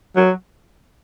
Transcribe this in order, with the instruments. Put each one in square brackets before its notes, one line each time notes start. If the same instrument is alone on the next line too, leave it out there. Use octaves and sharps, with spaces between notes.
[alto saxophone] F#3